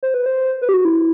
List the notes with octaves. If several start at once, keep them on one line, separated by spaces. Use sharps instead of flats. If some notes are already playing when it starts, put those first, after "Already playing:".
C5
B4
C5
B4
G4
F#4
E4